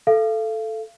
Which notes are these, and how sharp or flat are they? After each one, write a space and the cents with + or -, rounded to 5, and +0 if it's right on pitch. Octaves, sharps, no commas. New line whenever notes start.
A4 +0 F5 -35